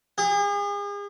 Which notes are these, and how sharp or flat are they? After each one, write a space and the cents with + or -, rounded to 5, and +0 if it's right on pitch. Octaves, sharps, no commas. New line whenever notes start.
G#4 -40